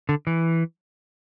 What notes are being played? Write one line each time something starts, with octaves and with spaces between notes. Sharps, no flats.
D3
E3